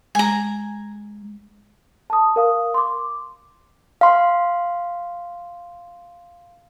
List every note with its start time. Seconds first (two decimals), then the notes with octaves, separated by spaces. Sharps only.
0.15 G#3 G#5 A#5
2.10 A5 D#6
2.36 A#4 F5 D#6
2.74 C6 D6
4.01 F5 C6